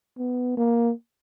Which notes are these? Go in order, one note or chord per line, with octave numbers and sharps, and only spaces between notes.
B3
A#3